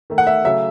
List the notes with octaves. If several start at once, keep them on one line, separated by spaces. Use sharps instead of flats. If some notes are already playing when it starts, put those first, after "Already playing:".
D#3 A3
F#5
E5
C#3 F#3 A3 E5